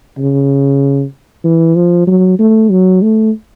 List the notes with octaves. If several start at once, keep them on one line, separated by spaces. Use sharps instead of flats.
C#3
E3
F3
F#3
A3
F#3
A3